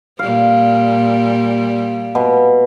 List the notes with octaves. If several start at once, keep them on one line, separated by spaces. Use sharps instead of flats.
A#2 G3 F5
B2